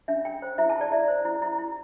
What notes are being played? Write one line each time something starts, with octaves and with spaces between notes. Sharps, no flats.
D4 E5
D4 G5
C5
E4 E5
A5
E4
D5
E4 E5
C5
E4
E4
E4